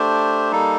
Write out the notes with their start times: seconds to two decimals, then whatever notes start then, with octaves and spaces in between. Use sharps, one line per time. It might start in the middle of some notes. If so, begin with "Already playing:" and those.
Already playing: A3 D4 G4 C5
0.52 G3 A#3 D#4 A4